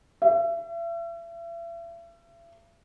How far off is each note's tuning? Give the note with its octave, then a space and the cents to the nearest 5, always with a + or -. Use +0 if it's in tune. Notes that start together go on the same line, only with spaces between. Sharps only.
E5 +40